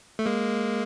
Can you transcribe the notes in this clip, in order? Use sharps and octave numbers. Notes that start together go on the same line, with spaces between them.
A3
G#3 A#3